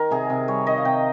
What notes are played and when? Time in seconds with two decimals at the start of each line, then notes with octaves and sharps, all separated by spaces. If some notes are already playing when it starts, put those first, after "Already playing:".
Already playing: D#3 A#4
0.11 C3 G#4
0.30 C3
0.48 G3 C#5
0.67 D#3 D#5
0.78 F5
0.85 C3 G5